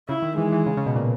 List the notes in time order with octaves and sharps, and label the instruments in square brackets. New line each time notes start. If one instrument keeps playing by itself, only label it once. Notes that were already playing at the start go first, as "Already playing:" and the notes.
[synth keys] C#3 [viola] E4
[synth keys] D#3
[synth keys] E3 [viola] G#3
[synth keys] E3
C#3
C#3
B2
A#2